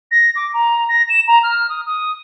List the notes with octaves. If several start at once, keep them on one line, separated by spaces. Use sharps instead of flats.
A#6
D6
A#5
A#6
E7
A#5
F6
D#6
D#6